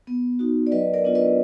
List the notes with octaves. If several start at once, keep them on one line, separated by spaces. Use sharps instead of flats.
B3
D#4 F#4
D5
F#3 B4 D#5
A#4 D5
B3 D4 F4
B4 D#5